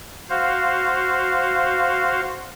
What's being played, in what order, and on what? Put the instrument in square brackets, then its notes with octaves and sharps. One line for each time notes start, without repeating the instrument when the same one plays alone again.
[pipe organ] F#4 C5 F5